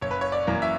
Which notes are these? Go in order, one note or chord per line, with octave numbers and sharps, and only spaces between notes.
F#1 C#5
B4
C#5
D5
F#2 E3 A#3
E5